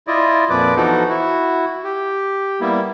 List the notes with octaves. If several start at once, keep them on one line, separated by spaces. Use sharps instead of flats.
E4 F4 D5 D#5
F2 A#2 F3 B4 D5 D6
E3 F3 B3 D#4 F#4 A4
E4 F#4
G4
G3 A#3 B3 E4